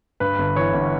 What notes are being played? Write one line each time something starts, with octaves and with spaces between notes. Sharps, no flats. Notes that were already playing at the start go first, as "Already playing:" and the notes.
G2 B4
G1
E3 C#5
G1